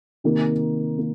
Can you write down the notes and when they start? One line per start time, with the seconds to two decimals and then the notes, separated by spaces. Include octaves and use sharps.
0.24 C3 D#3 A#3
0.99 A#3